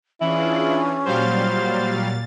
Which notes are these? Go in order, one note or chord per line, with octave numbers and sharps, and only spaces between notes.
E3 C#4 D4 E4 F4 G#4
A#2 F#3 G3 C5 F5 A6